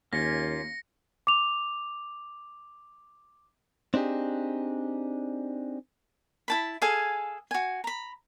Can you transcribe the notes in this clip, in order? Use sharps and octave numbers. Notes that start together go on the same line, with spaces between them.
D#2 A#3 C#4 F4 A#6 C#7
D6 F7
C4 D4 D#4 G4 G#4
E4 A5 B5
G#4 A4 F5 G#5
F#4 G#5
A#5 B5